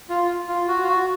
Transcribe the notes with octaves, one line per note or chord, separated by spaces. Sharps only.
F4
F4
F#4
F4
F#4